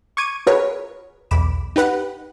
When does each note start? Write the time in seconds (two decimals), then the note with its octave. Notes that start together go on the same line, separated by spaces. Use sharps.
0.17 C#6 D6 G#6 D#7
0.47 F4 F#4 G#4 A#4 B4 C#5
1.31 B1 E2 B5 D6 E7
1.76 D#4 G4 B4 F#5